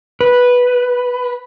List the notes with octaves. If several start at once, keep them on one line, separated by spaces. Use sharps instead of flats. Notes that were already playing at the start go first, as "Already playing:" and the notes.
B4